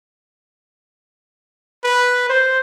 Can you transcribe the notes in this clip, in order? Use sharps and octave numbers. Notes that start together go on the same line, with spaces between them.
B4
C5